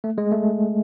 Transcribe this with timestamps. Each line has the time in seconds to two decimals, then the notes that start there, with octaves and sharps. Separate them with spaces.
0.04 A3
0.18 G#3
0.31 A3